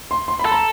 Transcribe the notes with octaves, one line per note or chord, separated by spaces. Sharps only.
C6
C6
B5
A4
A#5